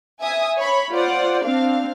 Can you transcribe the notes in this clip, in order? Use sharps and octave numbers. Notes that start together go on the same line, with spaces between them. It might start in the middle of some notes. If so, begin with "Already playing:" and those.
E5 G#5 D#6
C#5 B5
F4 C5 D5 F#5
C4 D4 F5